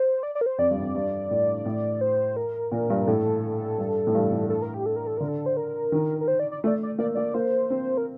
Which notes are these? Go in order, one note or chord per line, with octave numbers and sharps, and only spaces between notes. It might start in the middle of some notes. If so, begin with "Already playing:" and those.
Already playing: C5
D5
D5
A#4
C5
F2 D5
G2
F2
G2
A2
A2
C5
A#4
A#2
G2
A2 A4
G2
A2
G2
A2
A4
A#4
G4
A4
A#4
A4
D3 A#4
A4
C5
A#4
D#3
A#4
C5
D5
D5
A3
D5
D5
A#3 D5
A#3 D5
A#3 C5
C4
A#4